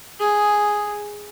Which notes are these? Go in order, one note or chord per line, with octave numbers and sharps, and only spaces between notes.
G#4